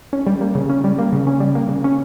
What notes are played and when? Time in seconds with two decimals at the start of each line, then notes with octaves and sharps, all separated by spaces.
0.13 C#4
0.27 G3
0.41 A#3
0.55 C#3
0.69 C#4
0.84 G3
0.98 A#3
1.13 C#3
1.27 C#4
1.40 G3
1.55 A#3
1.69 C#3
1.84 C#4